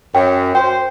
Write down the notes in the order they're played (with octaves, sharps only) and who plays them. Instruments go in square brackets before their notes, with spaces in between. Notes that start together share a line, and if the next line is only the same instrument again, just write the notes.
[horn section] F#2 [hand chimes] G5
[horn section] C5 [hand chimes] G5